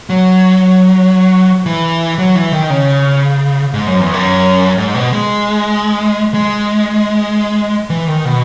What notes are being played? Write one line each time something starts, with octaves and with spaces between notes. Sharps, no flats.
F#3
E3
F#3
E3
D#3
C#3
G#2
F#2
E2
F#2
G#2
B2
G#3
G#3
E3
D#3
B2